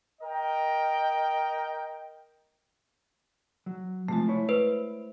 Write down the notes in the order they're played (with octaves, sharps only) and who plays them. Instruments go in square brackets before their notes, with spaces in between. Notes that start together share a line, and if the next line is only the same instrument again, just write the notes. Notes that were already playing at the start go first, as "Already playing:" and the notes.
[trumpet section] A#4 D#5 G5
[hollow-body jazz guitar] F#3
[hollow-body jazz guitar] C3 F3 [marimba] G#3 A3
[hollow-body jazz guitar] E4 C#5
[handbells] B4 C5